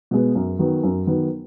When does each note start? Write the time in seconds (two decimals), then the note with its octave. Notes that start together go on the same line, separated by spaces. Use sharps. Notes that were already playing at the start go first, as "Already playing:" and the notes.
0.11 B2 G#3 B3
0.35 F#2
0.59 D#3 F#3 B3
0.83 F#2
1.07 D#3 F#3 B3